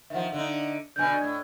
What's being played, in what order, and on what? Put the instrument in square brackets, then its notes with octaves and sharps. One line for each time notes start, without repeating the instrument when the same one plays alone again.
[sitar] D#3 F3 [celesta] E5 F#5
[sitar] D3 D#4
[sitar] B2 D3 [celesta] G#5 G6
[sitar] A2 [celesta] G#6